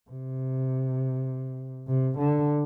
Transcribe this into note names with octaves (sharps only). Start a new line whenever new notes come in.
C3
C3
D3